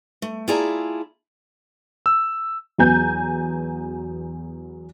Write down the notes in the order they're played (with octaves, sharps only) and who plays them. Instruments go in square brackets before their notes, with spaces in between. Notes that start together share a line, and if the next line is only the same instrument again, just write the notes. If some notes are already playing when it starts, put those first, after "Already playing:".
[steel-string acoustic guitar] A3
E4 F4 G#4 D5 A5 A#5
[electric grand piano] E6
[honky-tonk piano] E2 F#3 B3 G#5 A#5 G6